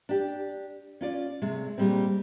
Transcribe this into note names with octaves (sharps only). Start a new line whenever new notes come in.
D4 G4
C#4 F4 D5
C3 G#3 A3
A#2 G3 G#3 C4